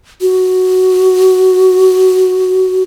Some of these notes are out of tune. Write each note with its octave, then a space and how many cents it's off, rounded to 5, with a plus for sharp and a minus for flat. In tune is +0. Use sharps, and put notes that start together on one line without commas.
F#4 +5